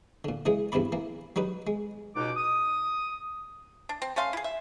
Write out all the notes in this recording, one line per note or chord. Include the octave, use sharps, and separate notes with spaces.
A#2 D3
C#3 E3 G#3 G#4
E2 G2 C3 E4 D5 B5
E3 A#3
F#3 G3 D#4 B4
G#3
C#2 B2 D#4 F#5 D6
D#6
D4
C4
A3 C#4 F5 C6
E4 G#4
E5